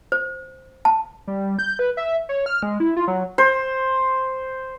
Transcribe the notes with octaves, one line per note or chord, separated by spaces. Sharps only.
C5
A5
G3
G6
B4
E5
C#5
F6
G#3
E4
F4
F#3
C5